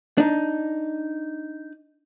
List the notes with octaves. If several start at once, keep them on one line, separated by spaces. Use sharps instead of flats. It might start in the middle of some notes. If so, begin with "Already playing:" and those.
D4 D#4